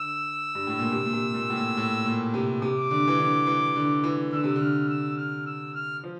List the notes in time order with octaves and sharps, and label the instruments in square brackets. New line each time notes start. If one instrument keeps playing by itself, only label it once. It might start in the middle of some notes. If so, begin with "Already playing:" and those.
Already playing: [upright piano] D3 [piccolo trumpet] E6
[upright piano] G2
A2
A#2
C3
A#2
C3
A#2
A2
A#2
A2
A#2
C3
[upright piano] C3 [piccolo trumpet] D6
[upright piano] D3
E3
D3
E3
D3
E3
[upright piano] D3 [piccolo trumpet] E6
[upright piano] C3
D3
[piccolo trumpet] F6
E6
F6
E6
F6
[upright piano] F3